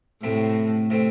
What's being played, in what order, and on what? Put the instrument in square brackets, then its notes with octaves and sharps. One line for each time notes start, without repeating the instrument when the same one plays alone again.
[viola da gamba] A2 [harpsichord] C3 A3 C4
[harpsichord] C3 A3 C4